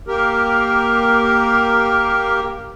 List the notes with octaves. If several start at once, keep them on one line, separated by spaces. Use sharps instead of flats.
A#3 G4 A#4